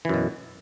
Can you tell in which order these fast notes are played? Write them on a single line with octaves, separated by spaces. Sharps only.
E3 F#2 B2